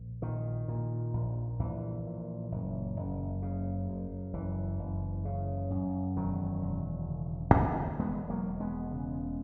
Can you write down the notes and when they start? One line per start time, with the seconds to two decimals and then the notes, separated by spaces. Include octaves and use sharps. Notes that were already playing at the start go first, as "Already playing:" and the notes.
Already playing: A#1
0.22 A#2 D#3
0.68 A#2
1.14 A#1
1.59 A#1 E3
2.05 A#2
2.52 F#1
2.97 F#1
3.42 C#3
3.89 F#2
4.33 F#1 E3
4.79 F#1
5.25 C#3
5.70 F#2
6.17 E1 D#3 F#3
6.63 E1
7.07 C#3
7.54 D#2
7.99 E1 G#3 B3
8.30 F#3 A#3
8.45 E1
8.60 G#3 B3
8.91 C#3